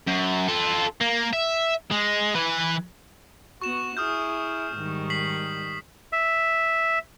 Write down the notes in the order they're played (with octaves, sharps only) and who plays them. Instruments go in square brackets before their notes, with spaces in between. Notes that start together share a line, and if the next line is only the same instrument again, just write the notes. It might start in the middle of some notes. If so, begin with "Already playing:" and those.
[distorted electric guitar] F#2
F4 A4
A#3
E5
G#3
E3 B4
[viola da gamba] B3 F#4 [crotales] C#6 E7
[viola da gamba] E4 G#4 [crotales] D#6 F6 G6
[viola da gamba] G#2 D#3 G3
[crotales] B6 C7 F#7
[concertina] E5